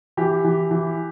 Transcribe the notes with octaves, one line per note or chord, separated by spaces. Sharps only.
E3 G4
E3
E3